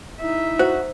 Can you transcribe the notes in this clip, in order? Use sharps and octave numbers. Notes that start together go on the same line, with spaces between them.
D#4 E4 E5
F#4 C5